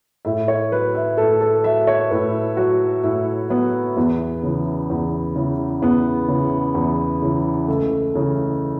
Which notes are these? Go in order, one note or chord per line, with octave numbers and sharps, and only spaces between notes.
A2 E5
C#5
F#3 B4
E5
A2 A4
A4
F#3 E5
C#5
A2 B4
F#3 F#4
A2 E4
F#3 B3
E2 B3
C#3 E3
E2
C#3 E3
E2 B3
C#3 E3
E2
C#3 E3
C#2 A3
C#3 E3